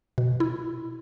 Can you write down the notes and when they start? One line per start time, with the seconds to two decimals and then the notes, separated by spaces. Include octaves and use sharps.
0.18 B2
0.40 E4